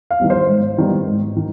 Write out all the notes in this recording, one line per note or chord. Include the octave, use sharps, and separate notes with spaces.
F5
D#3 G3 B3
C5
G#2
D#3 G3 B3
G#2
D#3